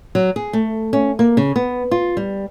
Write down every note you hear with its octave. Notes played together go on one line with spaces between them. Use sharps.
F#3
G#4
A3
C#4
A#3
C#3
B3
F4
G3